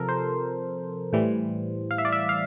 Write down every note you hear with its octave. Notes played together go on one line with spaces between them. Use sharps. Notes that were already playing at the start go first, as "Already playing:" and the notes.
Already playing: C3 F3 A4 A#4
C5
A2 E3 G3
F5
E5
D5
E5
F5